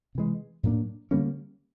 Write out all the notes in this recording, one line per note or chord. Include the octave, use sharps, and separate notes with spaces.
C3 E3 G#3
A2 F#3 A#3 D4
D3 G3 A#3 C#4